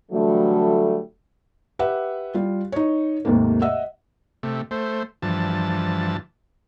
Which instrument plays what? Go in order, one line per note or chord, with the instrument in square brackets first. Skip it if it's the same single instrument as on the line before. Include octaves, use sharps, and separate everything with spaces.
[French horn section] D3 E3 F#3 G3 A3
[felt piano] G4 B4 E5 F#5
G3 F4
D#4 C#5
D#2 G#2 C3 A3 A#3
D#5 E5 F#5 E6
[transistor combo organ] C3 A3
A3 C5
G2 E3 F3 A5